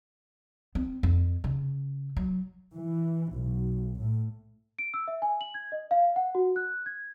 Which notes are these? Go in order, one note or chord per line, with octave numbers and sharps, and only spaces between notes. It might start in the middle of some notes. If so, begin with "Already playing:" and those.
C4
F2
C#3
F#3
E3
B1
A2
D7
E6
E5
G#5
F#7
G#6
D#5
F5
F#5
F#4
F#6
G#6